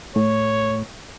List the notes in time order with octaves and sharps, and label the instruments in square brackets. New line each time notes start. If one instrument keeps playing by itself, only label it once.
[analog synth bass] A2 [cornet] C#5